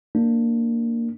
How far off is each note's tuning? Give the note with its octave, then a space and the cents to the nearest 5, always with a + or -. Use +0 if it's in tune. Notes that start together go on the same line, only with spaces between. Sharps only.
A#3 -10 D4 +10